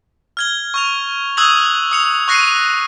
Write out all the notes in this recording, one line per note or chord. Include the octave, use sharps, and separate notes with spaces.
F6 G#6 G7
C#6 F6 F7
C#6 D#6 E6 F#6 G#6 F#7
D#6 C#7 F7
C#6 F#6 A#6 C7 C#7 D#7